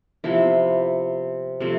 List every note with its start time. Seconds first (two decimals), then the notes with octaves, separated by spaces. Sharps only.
0.24 C3 F3 B3 E4
1.60 C3 F3 A3